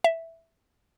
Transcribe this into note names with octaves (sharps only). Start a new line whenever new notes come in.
E5